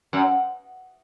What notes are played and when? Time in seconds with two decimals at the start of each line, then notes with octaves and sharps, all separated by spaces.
0.13 F#2